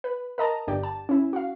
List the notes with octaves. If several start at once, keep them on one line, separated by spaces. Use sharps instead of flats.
B4
A#4 D#5 A5 A#5
G1 G2 G4 D5
A5
C#4 E4
F#4 F5